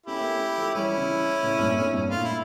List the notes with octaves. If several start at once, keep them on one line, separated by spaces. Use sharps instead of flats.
A3 C#4 E4 G4
A#3
A3 C#4
F3 A3
E3 G3 C#4 E4
C#3 E3
A2 C#3
G2 A#2
F2 A2
G2 A#2
A2 F4
A#2 E4